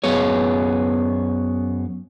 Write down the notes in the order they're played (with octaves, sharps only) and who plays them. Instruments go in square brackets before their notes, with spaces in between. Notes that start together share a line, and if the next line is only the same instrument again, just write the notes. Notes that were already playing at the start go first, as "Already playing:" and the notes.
[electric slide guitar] F#2 B3 G#4 C#5